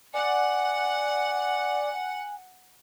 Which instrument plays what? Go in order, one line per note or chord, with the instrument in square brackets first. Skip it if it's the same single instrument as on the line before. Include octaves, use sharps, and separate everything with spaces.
[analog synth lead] D5 [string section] F#5 [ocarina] G#5